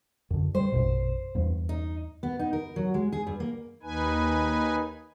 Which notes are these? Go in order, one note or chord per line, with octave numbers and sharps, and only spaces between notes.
F#2 D3
G3 C5
A#1 F#2 B2
E2 G2
D#4
B3
D#4
A#4
F#3
G#3
G#4
G2
A#3
D#2 D#4 B4 G#5